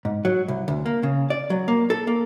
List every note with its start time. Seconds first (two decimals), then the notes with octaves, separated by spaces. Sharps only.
0.05 G#2
0.25 F#3
0.48 C2
0.68 D2
0.86 A#3
1.03 C#3
1.30 D5
1.50 F#3
1.68 A#3
1.90 A4
2.07 A#3